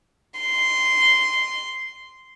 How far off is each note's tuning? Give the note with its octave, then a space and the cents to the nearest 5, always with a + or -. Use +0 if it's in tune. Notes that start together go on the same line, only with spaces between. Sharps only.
C6 -10